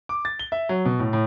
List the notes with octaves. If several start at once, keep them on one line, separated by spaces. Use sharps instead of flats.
D6
A6
G7
E5
F#3
B2
A2
A2